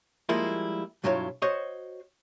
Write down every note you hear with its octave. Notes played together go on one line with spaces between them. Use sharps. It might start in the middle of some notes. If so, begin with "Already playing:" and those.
F3 G3 G#3 A#3 E4 F4
B1 G2 F#3 E4 F4 C#5
F#4 C5 C#5 D#5